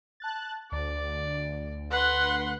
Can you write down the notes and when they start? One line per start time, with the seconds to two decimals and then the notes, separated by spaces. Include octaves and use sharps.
0.20 A5 F#6 A6
0.72 D2 D5
1.91 B4 F#5 C6